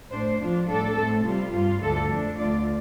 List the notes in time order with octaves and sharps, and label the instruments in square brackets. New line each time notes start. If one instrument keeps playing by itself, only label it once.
[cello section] A2 A3 D4 C5
F2 F3 D4 F4
A2 G3 D4 A4
A2 A3 C4
C3 G3 F4
G2 G3 F4
D2 D3 A3 A4
F2 F3 A3 D4
D2 D3 A3 F4 D5